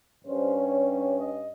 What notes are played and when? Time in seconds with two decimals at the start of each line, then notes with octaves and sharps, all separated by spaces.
0.25 G2 G3 C#4 C5
0.55 C#5
0.86 C#5
1.17 D#5